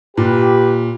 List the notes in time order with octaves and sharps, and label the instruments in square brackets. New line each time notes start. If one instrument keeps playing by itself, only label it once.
[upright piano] A#2 [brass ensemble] G4 B4